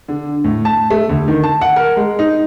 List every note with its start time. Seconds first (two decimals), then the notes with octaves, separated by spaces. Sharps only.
0.08 D3
0.44 A2
0.65 A5
0.90 A3
1.09 D2
1.28 D#3
1.44 A5
1.61 F#5
1.76 A#4
1.97 G#3
2.19 D#4